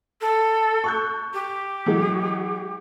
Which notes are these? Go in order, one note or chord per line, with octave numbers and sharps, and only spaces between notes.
A4
C#6 F#6 G6
G4
E3 F#3 G#3